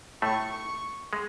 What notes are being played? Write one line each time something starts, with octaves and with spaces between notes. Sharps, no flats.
A2 A3 C#6
C#6
G#3